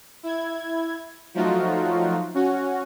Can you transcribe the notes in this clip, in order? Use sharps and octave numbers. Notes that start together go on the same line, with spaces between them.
E4 G#6
F3 F#3 A3 D#4 F4 F#4
C#4 F#4